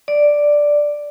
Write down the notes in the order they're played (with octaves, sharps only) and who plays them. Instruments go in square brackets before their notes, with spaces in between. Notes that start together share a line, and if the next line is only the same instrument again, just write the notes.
[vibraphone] D5